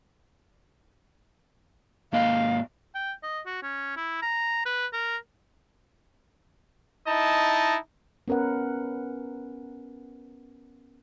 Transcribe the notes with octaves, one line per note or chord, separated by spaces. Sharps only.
G#2 A#3 D#5 F5
G5
D#5
F#4
C#4
E4
A#5
B4
A#4
D#4 E4 D#5 A5
B3 C#4 A#4 B4 F#5